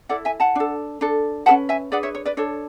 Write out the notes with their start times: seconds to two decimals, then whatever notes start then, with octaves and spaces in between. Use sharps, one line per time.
0.09 E4 A4 D5 F#5
0.25 E5 G#5
0.40 F#5 A5
0.55 D4 A4
1.01 D4 A4
1.46 C#4 G#4 B4 F#5 A5
1.69 E5 G#5
1.92 D4 G#4 B4 D5 F#5
2.03 C#5 E5
2.15 C#5
2.25 B4 D5
2.37 D4 A4 C#5